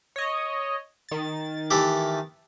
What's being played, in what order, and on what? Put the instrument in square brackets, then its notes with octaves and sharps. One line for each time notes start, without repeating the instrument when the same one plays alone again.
[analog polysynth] C#5 D#5
D#3 A6
[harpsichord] E3 A3 G4